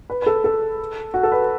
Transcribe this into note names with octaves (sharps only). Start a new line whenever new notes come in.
B4
B4
A4
A4
F#4
A4
B4